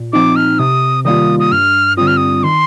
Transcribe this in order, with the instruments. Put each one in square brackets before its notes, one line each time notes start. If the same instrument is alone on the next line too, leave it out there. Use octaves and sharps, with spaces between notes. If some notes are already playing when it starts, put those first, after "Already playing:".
Already playing: [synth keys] A#2
[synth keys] F3 C4 D#4 [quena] D6
[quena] F6
[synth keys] C3 [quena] D#6
[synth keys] D#3 G3 A#3 F4 [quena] D#6
[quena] D#6
[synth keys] G2 [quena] F6
[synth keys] D3 G3 C4 F4 [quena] D#6
[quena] F6
D#6
[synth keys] D#3 [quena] C6